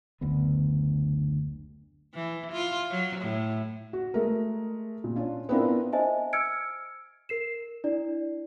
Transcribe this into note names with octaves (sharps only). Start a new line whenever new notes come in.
F#1 D2 D3 B3
E3
F4
F#3
A2
F#4
G#3 A3 A#4
A#2
C#4 D4 F4
B3 C4 D4 E4 F4 A#4
C5 D#5 E5 G#5 A5
E6 F6 G#6 C#7 D7
A#4 C7 E7
D4 E4 D5